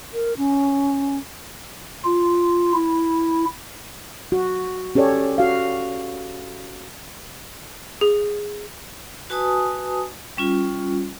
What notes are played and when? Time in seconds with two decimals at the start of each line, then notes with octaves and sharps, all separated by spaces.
0.13 A#4
0.38 C#4
2.05 F4
2.73 E4
4.32 F#4
4.95 C#4 G4 A4 C#5 D5
5.38 F#4 F5
8.01 G#4
9.30 F#4 B4 G#5 A5 D#6
10.37 G3 C#4 F4